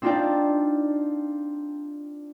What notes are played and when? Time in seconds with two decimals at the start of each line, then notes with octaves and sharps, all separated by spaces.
0.02 C4 D4 D#4 F4 D5 G5